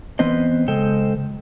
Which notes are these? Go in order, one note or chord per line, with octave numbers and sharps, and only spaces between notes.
E3 B3 C4 C5 D#5
C#3 G#3 A4 C5 D#5 G5